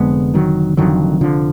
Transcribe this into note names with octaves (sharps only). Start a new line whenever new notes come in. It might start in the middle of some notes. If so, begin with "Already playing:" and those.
Already playing: F1 F2 D3 G#3 B3
D#3 F#3
F1 F2 D3 D#3 F#3
D3 F3